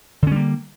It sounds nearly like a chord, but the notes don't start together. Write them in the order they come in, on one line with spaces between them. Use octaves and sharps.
D3 C#4 G3 A#3